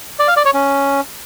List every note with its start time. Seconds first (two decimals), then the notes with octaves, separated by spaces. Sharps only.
0.19 D5
0.28 F5
0.36 D5
0.45 C#5
0.54 C#4